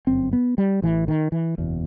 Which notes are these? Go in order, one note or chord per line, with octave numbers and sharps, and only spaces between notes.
G1 F#2 C4
B3
G3
A1 A2 E3
D#3
E3
F#1 E2 B2